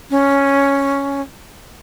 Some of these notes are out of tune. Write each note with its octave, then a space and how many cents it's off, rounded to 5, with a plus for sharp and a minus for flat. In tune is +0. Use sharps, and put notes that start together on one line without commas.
C#4 +0